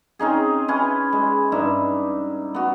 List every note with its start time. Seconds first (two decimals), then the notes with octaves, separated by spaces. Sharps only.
0.19 C4 C#4 D#4 G#4
0.68 C#4 E4 B4 G#5
1.13 G#3
1.52 G2 D#4 E5
2.54 B3 F#4